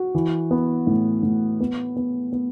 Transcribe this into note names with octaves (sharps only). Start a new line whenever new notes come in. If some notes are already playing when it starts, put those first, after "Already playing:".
Already playing: F#4
E3
B3
A2
A2
B3
B3
B3